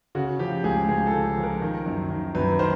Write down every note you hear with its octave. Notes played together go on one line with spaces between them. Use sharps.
C#3 F#4
F3 G4
C#2 G#4
C#2 G#4
A4
C#3
F3
A#4
D#3
F#2
D#3
F#2 B4
D#3 C5